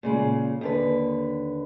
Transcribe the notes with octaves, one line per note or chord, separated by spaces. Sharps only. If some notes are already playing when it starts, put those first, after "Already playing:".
A#2 C#3 G#3
D#2 D3 B4